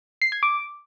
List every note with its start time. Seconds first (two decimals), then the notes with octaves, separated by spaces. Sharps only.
0.22 C7
0.32 G#6
0.43 D6